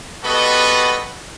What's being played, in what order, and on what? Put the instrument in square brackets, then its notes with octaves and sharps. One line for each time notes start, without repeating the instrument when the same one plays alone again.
[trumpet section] G3 B3 F#4 A4 B4 D#5